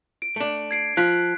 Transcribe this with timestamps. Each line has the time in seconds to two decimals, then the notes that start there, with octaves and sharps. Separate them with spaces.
0.22 D7
0.36 A3 D4
0.71 G#6 C7 D7
0.97 F3 F4 F#6 B6